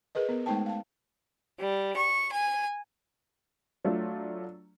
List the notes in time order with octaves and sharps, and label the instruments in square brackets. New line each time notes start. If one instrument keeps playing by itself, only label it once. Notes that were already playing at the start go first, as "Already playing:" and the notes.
[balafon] G#4 A#4 B4 D#5
B3 A#4
G#3 A3 D#4 C5 G5 A5
F5 A5
[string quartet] G3
C#6
G#5
[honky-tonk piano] F#3 A3 D4 F4